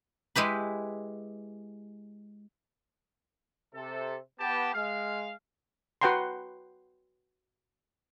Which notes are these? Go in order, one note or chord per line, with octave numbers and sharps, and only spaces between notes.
G#3 E4 G4 B4
C3 A4
B3 G4 A5
G#3 F5
F#4 B4 F#5 G5 A#5 C6